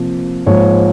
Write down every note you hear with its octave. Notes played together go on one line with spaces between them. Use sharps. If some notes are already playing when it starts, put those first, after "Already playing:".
Already playing: C3 F3 A#3
G#2 F3 A#3 C#5